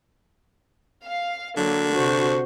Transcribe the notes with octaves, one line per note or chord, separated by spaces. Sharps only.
F5
D3 F#3 A#3
C3 F#4 C5